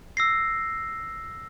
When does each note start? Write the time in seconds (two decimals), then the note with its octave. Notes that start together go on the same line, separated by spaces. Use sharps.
0.17 E6 A#6 C7